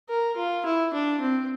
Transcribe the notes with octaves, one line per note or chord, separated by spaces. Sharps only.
A#4
F4
E4
D4
C4